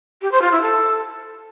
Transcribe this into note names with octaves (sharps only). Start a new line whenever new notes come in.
G4
C5
F4
E4
A4